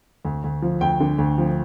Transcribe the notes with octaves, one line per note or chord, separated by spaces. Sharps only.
D2
D2
F3
D2 G5
D3
D2
F3